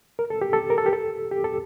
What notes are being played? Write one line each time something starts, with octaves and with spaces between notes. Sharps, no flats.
A#4
A4
G4
A4
A#4
A4
G4
A4
G4
A4